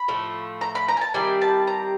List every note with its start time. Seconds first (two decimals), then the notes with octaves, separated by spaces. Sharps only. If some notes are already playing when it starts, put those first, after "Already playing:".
Already playing: B5
0.08 A2 F3 A3
0.61 A#5
0.75 B5
0.88 A#5
0.97 G#5
1.01 A5
1.14 D#3 G3 C4 E4 G#5
1.42 A5
1.67 A#5